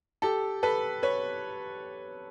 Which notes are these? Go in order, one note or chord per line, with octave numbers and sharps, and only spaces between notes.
G4 A4
A4 B4
B4 C#5